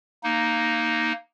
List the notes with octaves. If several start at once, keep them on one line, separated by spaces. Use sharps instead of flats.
A#3 D#4